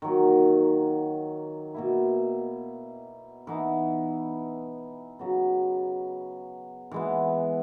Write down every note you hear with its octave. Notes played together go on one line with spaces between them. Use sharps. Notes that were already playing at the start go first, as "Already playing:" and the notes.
D#3 F#3 A#3
B2 A#3 E4
E3 B3 D#4
C#3 F#3 B3
E3 G#3 B3